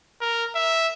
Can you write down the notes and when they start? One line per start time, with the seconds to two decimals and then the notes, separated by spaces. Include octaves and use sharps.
0.21 A#4
0.55 E5